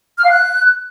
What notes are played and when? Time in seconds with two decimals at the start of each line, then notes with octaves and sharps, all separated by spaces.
0.17 F6
0.23 F5
0.29 F#6